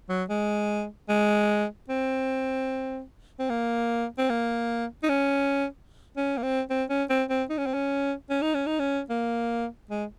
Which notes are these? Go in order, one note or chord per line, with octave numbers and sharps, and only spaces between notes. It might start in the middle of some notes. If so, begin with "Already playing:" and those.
F#3
G#3
G#3
C4
C4
A#3
C4
A#3
D#4
C#4
C#4
A#3
C4
C4
C#4
C4
C4
D#4
C#4
C4
C#4
C#4
D#4
C#4
D#4
C#4
A#3
G#3